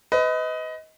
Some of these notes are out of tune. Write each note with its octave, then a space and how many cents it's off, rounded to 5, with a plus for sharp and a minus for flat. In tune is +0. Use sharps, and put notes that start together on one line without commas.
B4 +30 D#5 +20